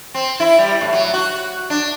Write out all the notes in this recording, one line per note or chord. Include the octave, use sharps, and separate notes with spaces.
C4
E4
G3
A2
F#3
F#4
D4